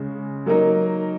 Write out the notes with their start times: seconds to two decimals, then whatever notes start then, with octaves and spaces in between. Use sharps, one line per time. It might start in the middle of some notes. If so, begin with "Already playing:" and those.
Already playing: C#3 G#3 C#4
0.46 F#3 A#3 D#4 A#4